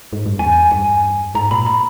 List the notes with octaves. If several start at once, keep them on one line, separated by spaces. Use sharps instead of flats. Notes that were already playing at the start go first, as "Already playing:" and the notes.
G#2
G2
E2 G#5
G2 G#5
G#2 A#5
A#2 B5
B5